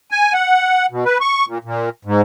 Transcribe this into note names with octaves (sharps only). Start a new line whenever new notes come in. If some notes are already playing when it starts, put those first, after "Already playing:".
G#5
F#5
B2
B4
C#6
A#2
A#2
G#2